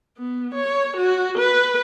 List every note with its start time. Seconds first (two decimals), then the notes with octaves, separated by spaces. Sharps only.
0.17 B3
0.54 C#5
0.97 F#4
1.38 B4